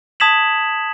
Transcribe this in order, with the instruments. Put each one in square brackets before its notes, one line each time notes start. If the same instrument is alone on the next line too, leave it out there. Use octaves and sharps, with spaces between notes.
[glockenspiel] A5 D#6 G#6 B6 E7 F#7